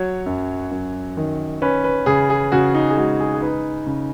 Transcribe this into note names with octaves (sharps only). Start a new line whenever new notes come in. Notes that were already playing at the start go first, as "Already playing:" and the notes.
Already playing: F#3 C#5
F#2
F#2
D#3
C#4 B4
B4
C#3 G#4
G#4
C#3 F#4
D#4
G#4
G#3 F#4
G#4
G#4
D#4 B4
C#3